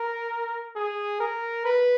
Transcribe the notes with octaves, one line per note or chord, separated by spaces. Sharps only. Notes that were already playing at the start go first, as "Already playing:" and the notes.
Already playing: A#4
G#4
A#4
B4